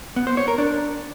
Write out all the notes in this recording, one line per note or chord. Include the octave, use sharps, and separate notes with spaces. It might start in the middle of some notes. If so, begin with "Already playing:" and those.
B3
C5
C#5
A#4
D4